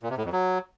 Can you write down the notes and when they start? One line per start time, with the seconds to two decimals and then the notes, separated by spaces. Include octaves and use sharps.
0.03 A#2
0.10 C3
0.18 A2
0.25 F2
0.33 F#3